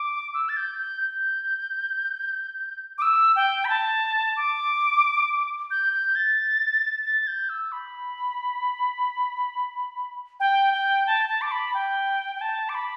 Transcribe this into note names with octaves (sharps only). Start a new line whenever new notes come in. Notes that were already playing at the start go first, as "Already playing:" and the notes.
Already playing: D6
E6
A6
G6
G6
G6
D6
E6
G5
B5
A5
D6
G6
G6
A6
A6
G6
E6
B5
G5
G5
A5
A5
D6
B5
G5
G5
A5
D6
B5